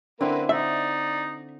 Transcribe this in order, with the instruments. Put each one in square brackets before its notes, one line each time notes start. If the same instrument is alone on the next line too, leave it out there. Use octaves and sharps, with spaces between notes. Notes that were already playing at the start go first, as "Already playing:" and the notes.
[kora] D3 C4 E4 [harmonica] A#3 A#4 B4
[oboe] D#4 [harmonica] D5 [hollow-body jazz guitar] E5